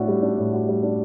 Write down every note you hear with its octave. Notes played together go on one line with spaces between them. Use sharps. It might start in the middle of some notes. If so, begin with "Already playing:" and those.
Already playing: A2 D4 F#4
G3
D4
A2
F#4
G3
D4